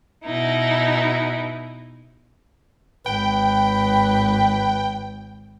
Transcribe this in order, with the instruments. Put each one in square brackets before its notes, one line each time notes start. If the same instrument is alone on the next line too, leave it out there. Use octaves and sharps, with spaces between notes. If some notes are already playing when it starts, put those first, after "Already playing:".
[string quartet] B2 D#4 E4
[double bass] G#1 [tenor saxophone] B4 [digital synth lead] G5